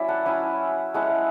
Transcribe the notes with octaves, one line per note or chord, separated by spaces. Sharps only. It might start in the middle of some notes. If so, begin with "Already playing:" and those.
Already playing: F#3 C#4 E4 D5 E5
F#5 A5
F#3 C#4 E4 G#5 B5
G#3 C#4 E4 F#5 A5